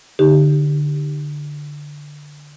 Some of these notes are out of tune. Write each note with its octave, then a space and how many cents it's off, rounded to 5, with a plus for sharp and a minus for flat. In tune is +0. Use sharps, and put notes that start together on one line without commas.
D3 +0 D#4 +0 G4 +0